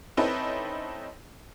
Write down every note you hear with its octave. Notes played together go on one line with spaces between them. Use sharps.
C4 C#4 D#4 E4 A4 B4